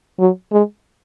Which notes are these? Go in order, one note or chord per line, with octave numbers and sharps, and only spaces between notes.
F#3
G#3